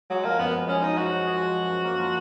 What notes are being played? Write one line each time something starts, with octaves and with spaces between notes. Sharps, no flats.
F#3 G#3
F3 A#3
F#2 B3
F#2
G#3 C#4
F3 D#4
F#2 F#4
F#2
G#3
F3
F#2
F#2
A#3
F3